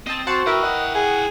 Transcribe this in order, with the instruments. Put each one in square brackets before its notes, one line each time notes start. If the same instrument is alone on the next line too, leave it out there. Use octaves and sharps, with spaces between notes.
[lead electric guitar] C4 [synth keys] D#5 A5
[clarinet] F#4 [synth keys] C5 F#5 A5
[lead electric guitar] E4 G5 [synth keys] A#4 B4 E5
[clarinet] D#5 [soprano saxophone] F#5
[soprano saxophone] G#4 [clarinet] F#5